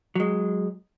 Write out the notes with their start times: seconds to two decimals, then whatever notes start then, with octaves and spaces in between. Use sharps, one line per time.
0.15 F#3 G#3